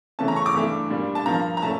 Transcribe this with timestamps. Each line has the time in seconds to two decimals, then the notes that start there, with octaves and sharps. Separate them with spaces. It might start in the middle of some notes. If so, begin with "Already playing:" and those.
0.19 C#3 E3 A3 C#4 A5
0.28 A#5
0.36 C#6
0.46 D6
0.55 G2 E3 A3 D4
0.90 A#2 G3 D4
1.15 A5
1.26 G2 F3 A#3 A#5
1.57 A#5
1.62 A#2 A3 C#4 A5